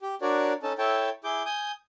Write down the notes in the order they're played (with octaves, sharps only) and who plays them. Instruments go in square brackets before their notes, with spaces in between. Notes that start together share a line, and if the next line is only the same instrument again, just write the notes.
[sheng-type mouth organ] G4
D4 F#4 A#4 C#5 D5
C#4 D#4 A4 A5
E4 A4 C#5 G5 A5
E4 G#4 D6 G6
G#5 D#6 G6